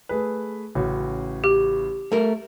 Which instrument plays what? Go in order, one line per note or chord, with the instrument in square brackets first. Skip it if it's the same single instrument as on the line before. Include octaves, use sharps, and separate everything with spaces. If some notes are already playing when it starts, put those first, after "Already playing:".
[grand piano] A3 G#4 B4
A1 C#3 F#4
[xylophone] G4
[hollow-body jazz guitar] A3 A#4